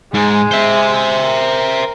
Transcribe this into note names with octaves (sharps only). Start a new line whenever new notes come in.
G#2 G#3
C5 E5
A#4